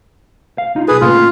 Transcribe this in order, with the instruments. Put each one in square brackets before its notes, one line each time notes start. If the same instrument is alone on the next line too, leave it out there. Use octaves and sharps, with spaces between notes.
[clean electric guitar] F5
D#4 F4
[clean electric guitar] B1 A4 [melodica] G#4 B4
[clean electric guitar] A2 C#3 A#3 [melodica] F4